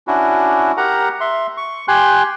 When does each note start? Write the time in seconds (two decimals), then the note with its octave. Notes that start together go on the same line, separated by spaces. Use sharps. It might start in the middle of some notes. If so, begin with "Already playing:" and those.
0.07 C#4 D4 E4 F#4
0.77 G4 A#4 F#5 A#5
1.20 E5 C6
1.57 C#6
1.88 G4 G5 G#5 C6 F#6